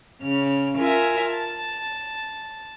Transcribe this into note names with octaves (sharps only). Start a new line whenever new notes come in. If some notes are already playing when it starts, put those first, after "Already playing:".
C#3 F6
F4 A#4 E5 G#5
A5